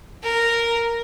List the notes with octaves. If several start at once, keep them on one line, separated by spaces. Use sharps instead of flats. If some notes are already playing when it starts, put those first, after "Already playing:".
A#4